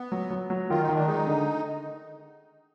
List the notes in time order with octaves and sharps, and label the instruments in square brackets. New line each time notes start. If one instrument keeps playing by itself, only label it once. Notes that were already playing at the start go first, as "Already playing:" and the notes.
Already playing: [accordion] B3
[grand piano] F#3
F#3
F#3
[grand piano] D#3 [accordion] F4
[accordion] D#4
[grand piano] D#3 [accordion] D4
[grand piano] G#3 [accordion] D#4
[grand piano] D3